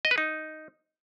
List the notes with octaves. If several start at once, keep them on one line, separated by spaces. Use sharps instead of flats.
D#5
B4
D#4